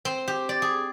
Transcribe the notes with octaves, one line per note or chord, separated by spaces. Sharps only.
C4
G4
D5
G#4